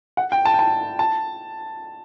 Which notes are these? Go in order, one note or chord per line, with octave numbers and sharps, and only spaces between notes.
F#5
G5
A5
G5
A5
A5